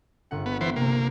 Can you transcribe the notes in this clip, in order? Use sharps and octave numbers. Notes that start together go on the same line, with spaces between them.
G1 F#5
B3
E3 B3 C5
C3 A#3